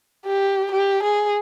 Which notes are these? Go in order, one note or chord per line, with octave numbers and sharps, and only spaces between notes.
G4
G4
G#4